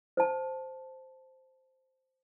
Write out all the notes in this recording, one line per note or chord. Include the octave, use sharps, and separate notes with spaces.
C5 A5